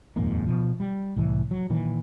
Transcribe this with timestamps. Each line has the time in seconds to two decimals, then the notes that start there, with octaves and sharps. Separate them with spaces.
0.16 D#1 F2 G#2 A#3
0.46 B2 F3
0.80 G3
1.16 C2 A2 E3
1.51 F#3
1.70 A#2 D#3 E3